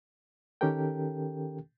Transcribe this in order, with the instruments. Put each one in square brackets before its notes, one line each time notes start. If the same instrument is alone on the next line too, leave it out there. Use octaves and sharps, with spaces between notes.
[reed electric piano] D#3 C#4 G4 A4 A#4 G5